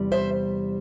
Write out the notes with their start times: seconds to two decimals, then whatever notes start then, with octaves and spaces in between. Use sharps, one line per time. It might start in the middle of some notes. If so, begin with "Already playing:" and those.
Already playing: E2 C3 G3
0.12 C5 E5